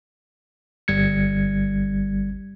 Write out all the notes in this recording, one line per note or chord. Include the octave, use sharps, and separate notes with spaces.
G1 G3 G#6 C#7